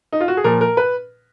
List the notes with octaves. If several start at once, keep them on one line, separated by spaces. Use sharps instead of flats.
D#4
F4
F#4
G#4
A#2 F3 A#4
A#4
B4